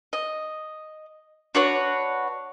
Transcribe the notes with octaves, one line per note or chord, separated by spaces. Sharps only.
D#5
D4 F#4 B4 C#5